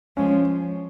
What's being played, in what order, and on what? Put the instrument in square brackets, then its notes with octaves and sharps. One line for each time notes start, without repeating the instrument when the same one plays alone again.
[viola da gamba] F3 G#3 [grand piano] C#4